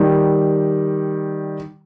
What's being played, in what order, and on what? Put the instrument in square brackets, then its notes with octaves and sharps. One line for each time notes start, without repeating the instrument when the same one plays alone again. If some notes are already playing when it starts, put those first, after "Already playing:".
Already playing: [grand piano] D#3 G3